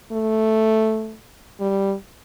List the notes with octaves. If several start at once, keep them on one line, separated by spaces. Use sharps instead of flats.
A3
G3